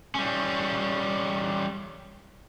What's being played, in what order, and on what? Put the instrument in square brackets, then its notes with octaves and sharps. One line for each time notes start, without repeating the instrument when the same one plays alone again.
[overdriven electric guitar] G3 C#4